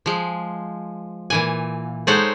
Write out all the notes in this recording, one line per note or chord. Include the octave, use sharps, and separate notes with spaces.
F3 G#3
A#2 E3 G#5
G#3 D#4 A4 C5 C#5 F#5